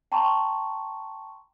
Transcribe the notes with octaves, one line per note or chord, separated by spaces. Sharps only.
G5 A5 A#5 C6 C#6